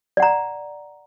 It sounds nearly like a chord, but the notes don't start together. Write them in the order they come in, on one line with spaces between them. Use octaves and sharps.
D5 F#5 A#5